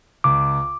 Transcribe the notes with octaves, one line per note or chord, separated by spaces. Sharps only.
C#2 D6